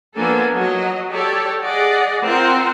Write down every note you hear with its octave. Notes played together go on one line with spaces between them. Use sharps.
F3 A#3 B3 D4 A4 G#5
F#3 D#5
G4 A4 C#5 D5
G#4 D5 D#5 F#5
C4 F4 A#4 C5 F#5